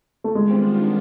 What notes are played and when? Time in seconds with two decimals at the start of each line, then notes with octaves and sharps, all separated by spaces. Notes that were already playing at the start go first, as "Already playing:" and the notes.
0.24 A3
0.34 D#3 G3 G#3 B3 D4 F4
0.51 C4